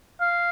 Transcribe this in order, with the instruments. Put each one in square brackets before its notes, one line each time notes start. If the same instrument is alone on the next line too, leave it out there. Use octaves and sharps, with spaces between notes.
[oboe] F5